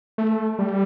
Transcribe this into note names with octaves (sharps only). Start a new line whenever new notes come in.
A3
G3